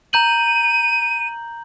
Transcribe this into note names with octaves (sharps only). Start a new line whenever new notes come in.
A#5 G6 D#7 F#7